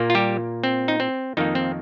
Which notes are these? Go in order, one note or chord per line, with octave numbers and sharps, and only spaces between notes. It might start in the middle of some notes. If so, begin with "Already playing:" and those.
Already playing: A#2 A#3
F4
G3 G4
C4
D#4
C4
F2 D#3 A#3 D#4
C4